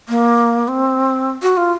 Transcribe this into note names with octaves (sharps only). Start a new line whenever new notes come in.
A#3
C4
F#4
F4